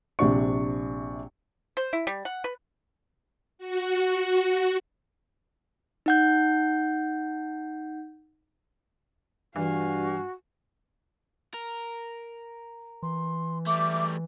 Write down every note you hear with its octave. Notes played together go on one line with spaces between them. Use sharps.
A#1 C3 D4 C#6
C5
E4
G3
F#5
B4
F#4
D#4 F#5 G6
G2 E3 F#4 F5 G#5
A#4
E3 C6
G3 A3 E5 D6